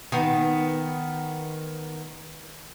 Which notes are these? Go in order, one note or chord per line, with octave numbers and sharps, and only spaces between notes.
D#3 B3